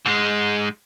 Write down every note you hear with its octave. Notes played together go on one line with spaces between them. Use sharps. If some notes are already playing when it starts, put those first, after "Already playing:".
G#2 G#3